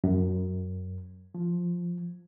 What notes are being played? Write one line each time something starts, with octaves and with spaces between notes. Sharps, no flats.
F#2
F3